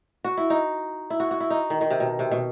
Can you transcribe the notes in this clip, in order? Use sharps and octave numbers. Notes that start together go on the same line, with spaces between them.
F#4
E4
D#4
E4
F#4
F#4
E4
D#4
D#3
D#3
C3
B2
C3
B2